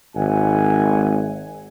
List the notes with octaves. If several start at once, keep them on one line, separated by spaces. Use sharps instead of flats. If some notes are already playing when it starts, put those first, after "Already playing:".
G#1 E5 F#5 G#5